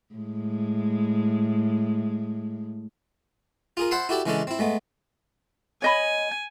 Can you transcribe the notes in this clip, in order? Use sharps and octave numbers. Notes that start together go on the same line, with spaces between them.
A2 G#3
F4 G#4 A#4
C5 E5 F#5 A5 B5 C6
E4 F#4 G4 A4 D5 E5
C#3 E3 G#3 C#4 D4 A4
C4 E4
G#3 A3 B3
C#5 D#5 G#5 B5